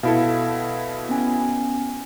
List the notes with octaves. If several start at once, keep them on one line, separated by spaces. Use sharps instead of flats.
B2 E4 A4 F5
B3 C#4 G#5